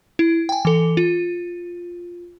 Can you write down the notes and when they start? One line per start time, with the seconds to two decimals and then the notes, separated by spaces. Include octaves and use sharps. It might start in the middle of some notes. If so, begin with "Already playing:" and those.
0.19 E4
0.49 G5 G#5
0.65 E3 A4
0.97 F4